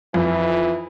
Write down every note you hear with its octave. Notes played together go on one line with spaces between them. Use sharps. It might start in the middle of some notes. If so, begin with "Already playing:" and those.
F2 E3